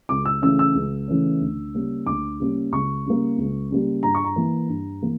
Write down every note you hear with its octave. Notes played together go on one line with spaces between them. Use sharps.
C#2 D6
E6
C#3 E3 A3 C#4 E6
E6
C#2
C#3 E3 A3 C#4
D2
C#3 G3 A#3 C#4
D2 D6
C#3 G3 A#3 C#4
C#2 C#6
C#3 G3 A#3
C#2
C#3 G3 A#3
G2 A#5
C#6
A#5
E3 A#3
G2
E3 A#3